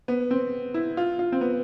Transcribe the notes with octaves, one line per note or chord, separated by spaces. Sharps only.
B3
C4
E4
F4
F4
C4
B3